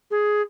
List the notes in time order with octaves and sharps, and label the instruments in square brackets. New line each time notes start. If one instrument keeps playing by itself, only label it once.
[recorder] G#4